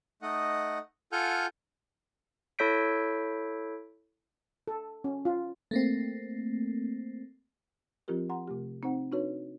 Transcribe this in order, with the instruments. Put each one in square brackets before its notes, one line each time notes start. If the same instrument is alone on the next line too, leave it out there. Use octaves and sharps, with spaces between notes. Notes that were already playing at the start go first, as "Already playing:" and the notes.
[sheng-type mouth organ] A3 D#4 D#5 F#5
F4 A4 F#5 G#5 F6 G6
[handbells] E4 A4 C#5 G6 B6 D7
[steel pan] A4
C#4
F4
[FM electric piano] A3 A#3 C4
[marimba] F3 C4 F4 G4 A#4
F#5 A#5 C6
C3 A3 G4
C4 D#4 C5 F#5
D4 D#4 F#4 B4 C#5